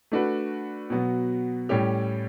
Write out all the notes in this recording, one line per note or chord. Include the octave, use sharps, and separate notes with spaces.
A3 D4 F#4 B4
B2 F#3 B3 F#4
A2 G3 C#4 G4